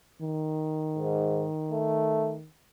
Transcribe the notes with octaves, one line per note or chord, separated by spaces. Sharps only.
D#3
G#2
A3